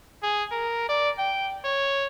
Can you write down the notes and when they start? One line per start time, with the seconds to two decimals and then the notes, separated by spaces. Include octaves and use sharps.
0.23 G#4
0.52 A#4
0.89 D5
1.19 G5
1.65 C#5